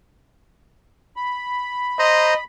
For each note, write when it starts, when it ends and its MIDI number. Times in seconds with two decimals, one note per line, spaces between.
1.16 2.44 83
1.99 2.34 72
1.99 2.35 75
1.99 2.34 82
1.99 2.34 84